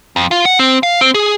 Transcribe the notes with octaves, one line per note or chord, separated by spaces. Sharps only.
F2
F4
F#5
C4
F5
C4
G#4